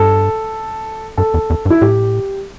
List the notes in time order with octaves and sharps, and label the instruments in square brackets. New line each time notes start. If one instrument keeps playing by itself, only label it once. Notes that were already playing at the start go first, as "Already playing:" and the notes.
Already playing: [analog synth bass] G2 [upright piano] A4
[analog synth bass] G2 [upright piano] A4
[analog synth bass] E2
E2
G2
[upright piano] E4
[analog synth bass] A2 [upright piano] G4